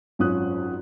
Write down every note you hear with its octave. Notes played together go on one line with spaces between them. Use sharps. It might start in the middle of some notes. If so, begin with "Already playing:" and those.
G#1 F#2 C#4 F4 D#6 F#6